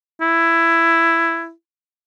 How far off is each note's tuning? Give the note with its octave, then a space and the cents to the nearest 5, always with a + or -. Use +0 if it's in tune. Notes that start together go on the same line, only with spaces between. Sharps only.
E4 +10